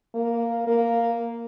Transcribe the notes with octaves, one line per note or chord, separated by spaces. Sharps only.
A#3
A#3